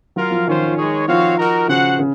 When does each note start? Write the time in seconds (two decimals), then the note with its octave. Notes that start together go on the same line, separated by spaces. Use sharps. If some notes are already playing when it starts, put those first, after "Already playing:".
0.15 F#3 F4 A#4 F5
0.31 F3
0.47 D#3 C#4 F4 C5
0.77 G#3 D#4 G#4 C#5
1.07 F3 C4 F#4 C#5 F5
1.38 D#4 F#4 A#4
1.68 C#3 F#4 C5 F#5
1.99 C#3